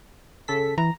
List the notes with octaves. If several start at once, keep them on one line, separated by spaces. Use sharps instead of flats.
C#3 A4 B6
E3 A#5